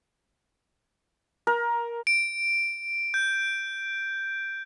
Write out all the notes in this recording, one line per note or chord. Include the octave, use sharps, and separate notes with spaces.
A#4
D7
G6